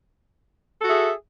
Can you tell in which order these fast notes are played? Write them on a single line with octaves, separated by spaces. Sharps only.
A4 F#4 G#4 E5